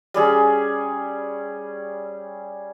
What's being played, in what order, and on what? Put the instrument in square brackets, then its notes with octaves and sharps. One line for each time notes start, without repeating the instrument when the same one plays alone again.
[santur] G3 C#4 G#4